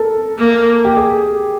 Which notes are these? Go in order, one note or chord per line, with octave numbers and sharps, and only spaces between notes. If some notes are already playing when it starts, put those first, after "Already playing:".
Already playing: A4 A#4
A#3
G4
G#4